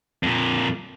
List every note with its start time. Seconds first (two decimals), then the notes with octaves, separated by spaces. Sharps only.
0.23 F2 A#2